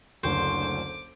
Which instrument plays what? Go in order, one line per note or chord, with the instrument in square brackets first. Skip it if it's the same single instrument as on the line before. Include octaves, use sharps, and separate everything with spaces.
[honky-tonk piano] F#1 D2 C#6 [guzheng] C5 [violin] D6